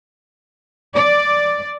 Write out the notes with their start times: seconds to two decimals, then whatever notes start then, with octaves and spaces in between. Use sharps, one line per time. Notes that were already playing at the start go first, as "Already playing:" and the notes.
0.95 D5